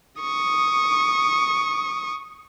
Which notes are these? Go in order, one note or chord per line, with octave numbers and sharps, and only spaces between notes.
C#6 D#6